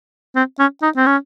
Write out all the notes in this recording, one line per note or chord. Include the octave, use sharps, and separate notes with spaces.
C4
C#4
D#4
C4
C#4